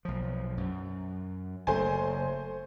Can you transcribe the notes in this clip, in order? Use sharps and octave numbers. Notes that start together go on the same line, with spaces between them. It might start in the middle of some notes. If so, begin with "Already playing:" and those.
B1 F3
F#2
F#1 A3 C5 G#5